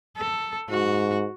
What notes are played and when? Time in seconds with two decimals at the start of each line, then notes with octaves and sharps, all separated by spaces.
0.18 A4
0.70 G#2 F#4